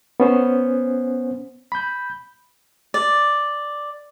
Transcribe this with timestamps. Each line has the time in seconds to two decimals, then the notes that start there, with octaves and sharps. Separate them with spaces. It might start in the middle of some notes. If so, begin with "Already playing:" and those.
0.20 B3 C#4 C5
1.72 B5 G6
2.94 D5